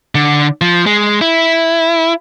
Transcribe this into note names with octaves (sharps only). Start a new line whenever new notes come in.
D3
F3
G#3
E4